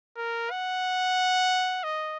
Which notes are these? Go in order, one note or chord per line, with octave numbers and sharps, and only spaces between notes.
A#4
F#5
D#5